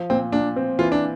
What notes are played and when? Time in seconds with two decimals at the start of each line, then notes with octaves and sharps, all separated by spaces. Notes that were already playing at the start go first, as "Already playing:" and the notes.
Already playing: F3
0.10 A#2 C4
0.32 A#2 D4
0.56 C4
0.79 E3 F4
0.92 D4